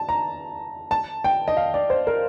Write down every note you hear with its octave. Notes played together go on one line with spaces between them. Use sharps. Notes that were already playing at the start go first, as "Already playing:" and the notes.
Already playing: A5
A#5
A5
G5
D#5
F5
D5
C5
A#4